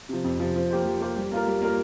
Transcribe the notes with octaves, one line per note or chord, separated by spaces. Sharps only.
C3 F3
F2
C3 F3
F3
A#3 G4 C5
F3
A#3 G4 C5
G3
A#3 F4 A#4
G3
A#3 F4 A#4